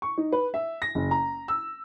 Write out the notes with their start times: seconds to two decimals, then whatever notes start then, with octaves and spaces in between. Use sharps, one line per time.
0.02 C#6
0.18 D#4
0.32 B4
0.54 E5
0.82 A#6
0.95 F#1
1.11 A#5
1.48 E6